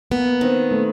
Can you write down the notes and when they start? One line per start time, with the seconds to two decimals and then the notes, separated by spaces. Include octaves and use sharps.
0.11 A#3 B3
0.41 D#3 C4
0.71 A3